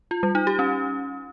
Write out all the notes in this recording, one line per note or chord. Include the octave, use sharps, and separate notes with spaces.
F4
G3
D#4
G4
C#4